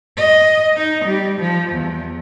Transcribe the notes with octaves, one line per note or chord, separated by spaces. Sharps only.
D#5
D#4
G3
F3
E2